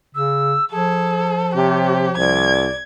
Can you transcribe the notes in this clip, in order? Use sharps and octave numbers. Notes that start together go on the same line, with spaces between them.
C#3 E6
F3 G#4 A4
C3 G4 C#5
C2 D5 G#6